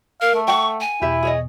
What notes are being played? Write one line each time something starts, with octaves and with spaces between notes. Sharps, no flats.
A#4 F5
A3
A4 F#5 G5 C#6
G#5
E2 B2 E4 G4 E5
G#4 C#5 D#5